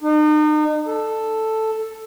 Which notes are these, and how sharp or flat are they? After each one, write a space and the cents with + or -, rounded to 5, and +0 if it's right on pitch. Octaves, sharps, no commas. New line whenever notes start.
D#4 -40
A4 +5